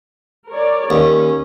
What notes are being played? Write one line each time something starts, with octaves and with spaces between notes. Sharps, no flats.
A#4 C#5 D5
D#2 C#4